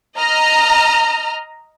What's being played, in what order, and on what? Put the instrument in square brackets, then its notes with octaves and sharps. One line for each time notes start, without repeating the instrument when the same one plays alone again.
[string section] D#5 A#5 F6